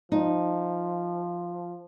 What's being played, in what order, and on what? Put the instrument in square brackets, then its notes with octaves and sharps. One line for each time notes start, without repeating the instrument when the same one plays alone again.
[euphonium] F3 [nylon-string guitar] D#4